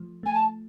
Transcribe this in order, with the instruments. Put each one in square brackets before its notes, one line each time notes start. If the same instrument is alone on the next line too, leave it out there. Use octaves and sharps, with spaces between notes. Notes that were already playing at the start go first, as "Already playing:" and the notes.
Already playing: [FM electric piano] F3 A3
[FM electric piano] A3 [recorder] G#5
[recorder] A5